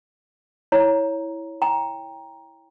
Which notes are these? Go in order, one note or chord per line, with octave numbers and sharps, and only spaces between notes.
E4 C#5 A#5
G5 A#5